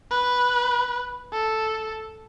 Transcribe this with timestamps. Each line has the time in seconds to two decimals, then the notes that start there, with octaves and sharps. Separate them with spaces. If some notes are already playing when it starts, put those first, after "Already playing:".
0.10 B4
1.33 A4